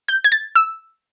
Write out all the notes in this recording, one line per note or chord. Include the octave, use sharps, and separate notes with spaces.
G6
G#6
A6
E6